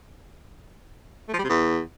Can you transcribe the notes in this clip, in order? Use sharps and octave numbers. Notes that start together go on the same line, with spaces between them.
A3
F3
G3
C3
E2